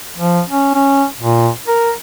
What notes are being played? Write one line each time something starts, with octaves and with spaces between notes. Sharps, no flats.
F3
C#4
C#4
A#2
A#4